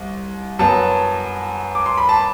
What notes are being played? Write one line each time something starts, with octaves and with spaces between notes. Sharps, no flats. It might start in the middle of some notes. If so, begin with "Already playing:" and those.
Already playing: C2
F#2 F#3 B3 A5
D6
C6
B5
A5